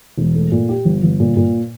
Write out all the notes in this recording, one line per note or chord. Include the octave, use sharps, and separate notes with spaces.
E1
A3
A#2
G4
G1
G1
A#2
A#2